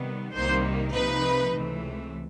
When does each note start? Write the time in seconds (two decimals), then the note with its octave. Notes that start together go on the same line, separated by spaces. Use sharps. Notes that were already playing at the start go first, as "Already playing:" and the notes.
Already playing: C3 D#3 G3 B3
0.33 C2 C3 D#3 G3 A#3 C5
0.93 C3 F3 A#3 D#4 B4
1.53 C#2 C3 E3 A3